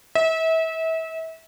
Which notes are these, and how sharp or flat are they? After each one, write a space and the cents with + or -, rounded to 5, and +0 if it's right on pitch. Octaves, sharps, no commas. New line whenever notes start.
E5 -30